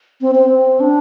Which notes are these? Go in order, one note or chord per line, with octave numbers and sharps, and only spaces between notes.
C4
C4
C4
D4